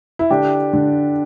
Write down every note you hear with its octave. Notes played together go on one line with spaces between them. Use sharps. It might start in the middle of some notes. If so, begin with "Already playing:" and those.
E4
D3 D4 G4
D3